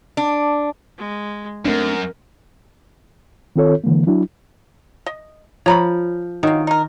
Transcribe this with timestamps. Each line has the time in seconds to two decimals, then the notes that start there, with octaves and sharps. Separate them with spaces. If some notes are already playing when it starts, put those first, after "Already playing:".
0.17 D4
0.98 G#3
1.65 F#2 A3 C4 D4 A#4
3.56 D#3 C4 F4 A4 C#5
3.84 D3 E3 G#3 A#3
4.07 F#3 D4 E4 F#4
5.06 D#5
5.66 F3 C#5 A#5 B5
6.43 D#3 F#3 A#3
6.67 D#4 A#4